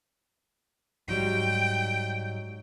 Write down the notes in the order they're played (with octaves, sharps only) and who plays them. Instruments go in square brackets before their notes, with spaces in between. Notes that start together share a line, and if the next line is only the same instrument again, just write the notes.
[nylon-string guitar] G#2 F#3 G3 [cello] G5